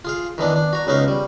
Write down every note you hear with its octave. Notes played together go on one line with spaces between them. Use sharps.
F4 G#4 F5
D#3 E3 B3 D4
D4
F#4 A#5
C#2 B3 C#4 D#4 F5
G3